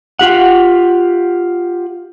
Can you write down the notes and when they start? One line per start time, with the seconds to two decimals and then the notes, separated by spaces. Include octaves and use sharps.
0.19 F4 G4 F#5